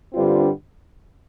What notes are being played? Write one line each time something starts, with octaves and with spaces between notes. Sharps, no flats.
G2 D3 G3 C4 F4